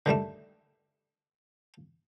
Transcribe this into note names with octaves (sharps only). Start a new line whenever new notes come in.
D3 D#3 G3 A3